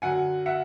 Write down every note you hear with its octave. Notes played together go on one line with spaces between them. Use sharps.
F#2 D3 F#3 F#5 G#5
E5 F#5